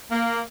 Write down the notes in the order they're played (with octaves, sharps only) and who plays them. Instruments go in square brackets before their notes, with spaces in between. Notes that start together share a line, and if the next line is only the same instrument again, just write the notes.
[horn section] A#3